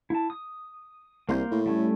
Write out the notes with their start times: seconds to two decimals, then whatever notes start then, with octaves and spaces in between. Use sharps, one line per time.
0.10 E4 A5
0.30 D#6
1.29 C2 A#3 C6 G6
1.51 A2
1.66 G3 A3 C#4